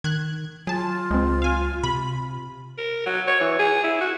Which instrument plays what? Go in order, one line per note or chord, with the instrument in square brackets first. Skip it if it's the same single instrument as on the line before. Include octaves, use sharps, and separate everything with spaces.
[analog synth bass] D#3 [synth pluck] F#6 G#6
[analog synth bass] F#3 [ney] F4 [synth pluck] G#4 A5
[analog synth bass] C#2 [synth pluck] G#3 C4
[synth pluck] F5 G#5
[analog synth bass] C3 [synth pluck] B5
[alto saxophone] A#4
F#3
C#5
E3
G#4
E4
F#4